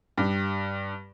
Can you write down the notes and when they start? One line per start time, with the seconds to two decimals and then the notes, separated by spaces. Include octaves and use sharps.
0.18 G2